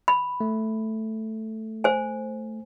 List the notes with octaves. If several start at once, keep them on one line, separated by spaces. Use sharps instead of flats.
B5
A3
C5 G#5